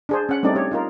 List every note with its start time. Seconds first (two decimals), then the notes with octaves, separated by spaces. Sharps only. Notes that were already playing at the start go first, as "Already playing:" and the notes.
0.09 D4 G#4 C5
0.29 C#4 F#5
0.43 G3 A3 C4 D4 D#4 D5
0.55 G4 C#5
0.71 D#4 F4 A#4